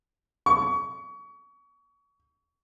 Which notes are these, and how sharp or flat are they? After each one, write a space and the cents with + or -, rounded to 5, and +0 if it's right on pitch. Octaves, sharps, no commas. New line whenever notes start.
C#6 +30